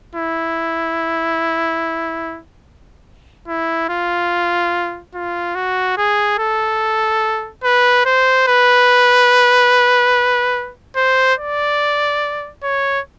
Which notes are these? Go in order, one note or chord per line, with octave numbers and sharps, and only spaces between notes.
E4
E4
F4
F4
F#4
G#4
A4
B4
C5
B4
C5
D5
C#5